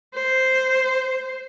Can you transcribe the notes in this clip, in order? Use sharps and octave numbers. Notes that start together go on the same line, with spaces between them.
C5